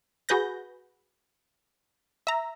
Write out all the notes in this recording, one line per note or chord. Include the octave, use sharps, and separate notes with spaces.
F#4 G#4 B4 G6 A#6
E5 A#5